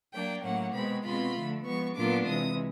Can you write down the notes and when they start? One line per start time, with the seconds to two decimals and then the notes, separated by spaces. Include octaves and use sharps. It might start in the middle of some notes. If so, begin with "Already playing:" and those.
0.13 F#3 A#3 D4 G5
0.44 A2 F#3 A#3 C#4 F#5
0.74 B2 G#3 C4 B5
1.05 B2 G#3 C4 F4 B5
1.35 D3 F3 A3
1.66 F3 G#3 B3 C#6
1.96 A#2 F#3 B3 D4 F4 D6
2.26 C3 E3 G#3 D#6